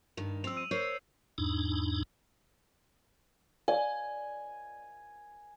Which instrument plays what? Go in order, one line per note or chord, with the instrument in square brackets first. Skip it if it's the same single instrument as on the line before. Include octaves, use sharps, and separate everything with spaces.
[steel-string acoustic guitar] G2 D#3 [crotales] F7
[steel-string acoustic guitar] F2 C4 [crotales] E6 F7
[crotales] E6 D#7
[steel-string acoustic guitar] A#4 C5 C#5 [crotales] G6 C7
[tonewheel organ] E2 G#2 D4 D#4
[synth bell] D5 [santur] G#5